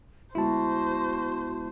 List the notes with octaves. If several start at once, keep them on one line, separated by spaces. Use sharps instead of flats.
D2 G#3 B3 E4 F#4 C5 A5